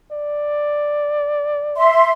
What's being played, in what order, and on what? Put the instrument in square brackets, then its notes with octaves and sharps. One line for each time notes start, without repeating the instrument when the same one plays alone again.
[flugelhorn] D5
[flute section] E5 C6